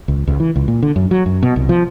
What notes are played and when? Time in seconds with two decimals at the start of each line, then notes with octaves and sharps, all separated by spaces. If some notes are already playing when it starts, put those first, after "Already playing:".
0.08 C#2
0.27 C#2
0.40 E3
0.56 C#2
0.68 A#2
0.83 D3
0.96 F#2
1.11 F#3
1.26 F#2
1.43 B2
1.56 C2
1.69 F3